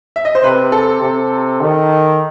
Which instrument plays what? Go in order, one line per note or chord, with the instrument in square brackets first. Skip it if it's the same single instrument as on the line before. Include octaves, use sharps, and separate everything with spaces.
[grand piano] E5
D#5
C5
[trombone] C3 [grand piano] B4
[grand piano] A4
[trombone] C3
D#3